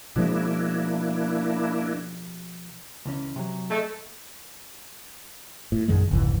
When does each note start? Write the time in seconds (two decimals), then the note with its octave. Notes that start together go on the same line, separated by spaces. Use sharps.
0.16 B2 F3 G#3 A#3 D4 E4
3.05 C#2 E3 C#4
3.36 C3 F#3
3.71 A3 G#4 D#5
5.72 A2
5.88 A#1 F#2 D#3 G#3
6.11 F1 C#2 G#2 E3